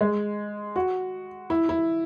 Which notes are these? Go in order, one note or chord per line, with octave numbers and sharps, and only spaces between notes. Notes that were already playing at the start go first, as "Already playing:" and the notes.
G#3
F#4
E4
E4